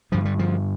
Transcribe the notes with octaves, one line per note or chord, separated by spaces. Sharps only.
G2 D3 F3
G3
F3